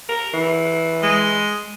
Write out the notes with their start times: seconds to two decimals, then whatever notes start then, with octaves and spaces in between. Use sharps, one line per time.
0.09 A#4
0.34 E3
1.03 G#3